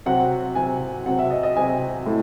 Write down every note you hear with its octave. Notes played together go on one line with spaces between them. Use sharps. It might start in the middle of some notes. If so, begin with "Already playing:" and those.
C3 F#3 C4 F#5
C3 F#3 C4 G#5
C3 F#3 C4 F#5
E5
D#5
D#5
C3 F#3 C4 G#5
A2